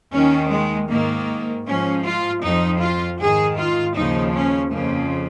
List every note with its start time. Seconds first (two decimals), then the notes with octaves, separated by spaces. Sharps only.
0.13 D#2 D#3 C#4
0.51 G#3
0.90 G#2 D#3 A#3
1.66 G#2 F3 C#4
2.05 F4
2.43 F2 F3 D#4
2.81 F4
3.19 G#2 D#3 G#4
3.57 F4
3.95 D#2 C#3 F3 D#4
4.34 C#4
4.72 F2 C#3 F3 A#3